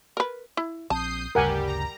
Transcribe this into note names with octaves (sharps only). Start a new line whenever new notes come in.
A#4 B4
E4
A#1 C4 A5 D#6 G6 C7
G1 D2 C#3 G3 G4 A#4 F#5 G#5
A#5